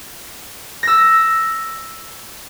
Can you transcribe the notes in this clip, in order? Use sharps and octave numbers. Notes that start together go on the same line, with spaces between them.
E6 A#6